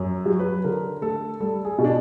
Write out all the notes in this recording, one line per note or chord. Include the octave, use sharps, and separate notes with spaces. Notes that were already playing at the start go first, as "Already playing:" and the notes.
Already playing: F#2
F#3
B4
D3 A#4
A3 A4
G3 A4
G#4
B2
D4